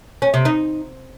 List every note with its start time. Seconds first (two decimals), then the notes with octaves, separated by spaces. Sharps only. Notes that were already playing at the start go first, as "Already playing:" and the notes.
0.22 C#4
0.34 C3
0.45 D#4